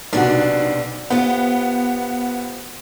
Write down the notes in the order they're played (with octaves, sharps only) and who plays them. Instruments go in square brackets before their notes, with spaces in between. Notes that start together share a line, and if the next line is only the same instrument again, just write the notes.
[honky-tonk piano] B1 F#4 [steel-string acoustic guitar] C3 B3 D4
[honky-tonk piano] B3 [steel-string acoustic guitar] F4 G4 C5